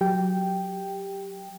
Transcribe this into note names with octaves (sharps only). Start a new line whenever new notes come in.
F#3 G4 G5